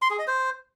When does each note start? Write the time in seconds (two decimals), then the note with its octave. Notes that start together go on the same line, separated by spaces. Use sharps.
0.02 C6
0.10 G#4
0.19 D#5
0.27 C5